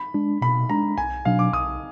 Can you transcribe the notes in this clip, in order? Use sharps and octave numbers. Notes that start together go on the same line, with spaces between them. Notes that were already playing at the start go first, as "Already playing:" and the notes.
Already playing: B5
G#3 D4
B2 B5
G#3 D4 A#5
B1 G#5
B2 F#3 D4 F5
D6
B1 D#6